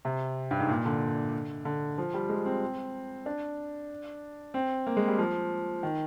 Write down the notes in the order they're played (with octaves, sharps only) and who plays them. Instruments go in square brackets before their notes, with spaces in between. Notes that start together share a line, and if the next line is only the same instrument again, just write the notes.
[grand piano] C3
G2
G#2
A#2
D3
D3
F3
G3
G#3
C4
D4
C4
A#3
G#3
G3
F3
D#3